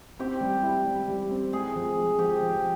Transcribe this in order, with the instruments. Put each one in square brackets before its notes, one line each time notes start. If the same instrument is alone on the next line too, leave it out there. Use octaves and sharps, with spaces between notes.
[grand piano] C4 [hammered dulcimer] G4
[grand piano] G3
E4
G3
G3
C4
[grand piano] G#3 [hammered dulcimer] G#4
[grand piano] F3
G#3
[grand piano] F3 [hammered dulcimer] G4
[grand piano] F3